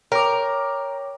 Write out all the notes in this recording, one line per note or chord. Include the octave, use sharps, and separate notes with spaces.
A#4 C#5 G5 A#5 D6